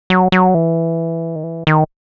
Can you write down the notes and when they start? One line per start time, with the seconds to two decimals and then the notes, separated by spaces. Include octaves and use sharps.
0.10 F#3
0.32 F#3
0.54 E3
1.36 D#3
1.44 E3
1.67 D#3